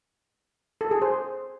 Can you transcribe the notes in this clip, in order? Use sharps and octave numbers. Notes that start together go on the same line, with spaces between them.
A4
G#4
C5